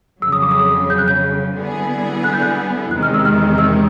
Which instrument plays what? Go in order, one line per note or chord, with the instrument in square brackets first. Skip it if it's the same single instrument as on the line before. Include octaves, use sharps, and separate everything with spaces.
[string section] F2 C#3 F#3 [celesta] E6
[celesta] D#6
D6
D#6
G6
F#6
G6
[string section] D3 G3 B3 E4 G#4
[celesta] F#6
G6
F#6
[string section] E2 C3 D#3 G#3 [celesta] F#6
[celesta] F6
E6
F6
E6